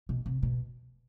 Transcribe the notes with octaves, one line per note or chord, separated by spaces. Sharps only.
B2
C3
B2